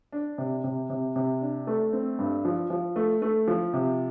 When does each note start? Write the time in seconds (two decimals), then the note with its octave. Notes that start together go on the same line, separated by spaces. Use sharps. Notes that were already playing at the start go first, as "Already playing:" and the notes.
0.13 D4
0.38 C3
0.64 C3
0.90 C3
1.16 C3
1.41 D4
1.67 A3
1.93 C4
2.19 G2
2.45 F3
2.70 F3
2.96 A3
3.22 A3
3.48 F3
3.73 C3